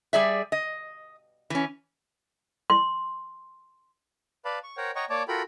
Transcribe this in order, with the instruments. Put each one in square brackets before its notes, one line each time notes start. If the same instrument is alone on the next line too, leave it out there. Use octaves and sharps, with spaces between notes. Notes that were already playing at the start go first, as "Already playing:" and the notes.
[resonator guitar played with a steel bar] G3 G#4 D5 E5
D#5
E3 C#4
[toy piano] C6
[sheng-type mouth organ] B4 D5 F5 A5 B5
C#6
A#4 C5 C#5 F#5 G5
C#5 D#5 F#5 G5 A#5 C#6
A#3 C#5 D5 A5 D6
F4 F#4 A4 A#4 G5 B5